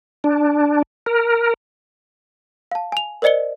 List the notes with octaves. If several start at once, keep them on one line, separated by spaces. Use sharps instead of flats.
D4
A#4
F5 A5
G#5 F7
A#4 C5 D5 D#5 C#7 G7